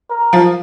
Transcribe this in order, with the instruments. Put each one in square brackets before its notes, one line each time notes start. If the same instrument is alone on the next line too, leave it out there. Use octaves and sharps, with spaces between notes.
[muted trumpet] A#4
[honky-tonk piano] F3 F4